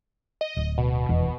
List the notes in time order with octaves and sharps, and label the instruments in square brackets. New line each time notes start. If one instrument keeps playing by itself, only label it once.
[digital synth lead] D#5
[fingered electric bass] D1
[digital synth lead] B2
[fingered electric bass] F1 E2